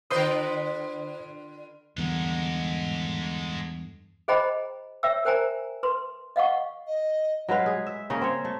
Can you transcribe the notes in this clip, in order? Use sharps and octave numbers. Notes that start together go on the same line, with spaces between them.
D3 F4 B4 C5 C6 D#6
E2 G2 D3 G#3 A#4
G#4 C5 D#5 G5 A#5 B5
C#5 E5 G5 E6
A#4 C5 G5 G#5 A#5
B4 C6
D#5 F5 F#5 C#6
D#5
F#3 G#3 B4 F5
G#4
E5
C#3 A#3 C#4
C4 C#5
A3